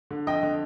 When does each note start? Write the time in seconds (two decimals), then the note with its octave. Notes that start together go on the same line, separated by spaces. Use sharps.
0.11 D3
0.27 F2 D#5 G5
0.43 D3